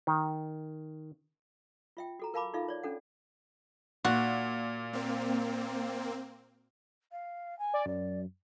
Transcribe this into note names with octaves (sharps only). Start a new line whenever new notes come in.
D#3
F4 E5 G5
F#4 A4 A#5
A#4 F5 A5 B5 D6
D#4 F4 A4 E5 F5
C#5 D5
C#4 D4 A4 F#5
A#2 F#4
A#3 C4
F5
G#5
D5
F#2 D5